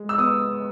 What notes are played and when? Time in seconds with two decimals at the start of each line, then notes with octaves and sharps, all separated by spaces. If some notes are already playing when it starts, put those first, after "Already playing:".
Already playing: G#3
0.09 E6
0.18 B3 D#6